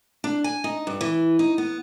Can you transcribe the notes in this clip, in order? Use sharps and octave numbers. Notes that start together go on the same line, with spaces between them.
D4
G#5
D#4
G2
E3
D#4
B3